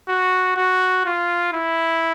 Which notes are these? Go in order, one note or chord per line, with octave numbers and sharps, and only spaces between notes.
F#4
F#4
F4
E4